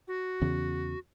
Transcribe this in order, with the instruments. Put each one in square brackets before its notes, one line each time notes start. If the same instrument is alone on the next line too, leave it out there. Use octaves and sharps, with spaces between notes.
[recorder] F#4
[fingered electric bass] E2 C#3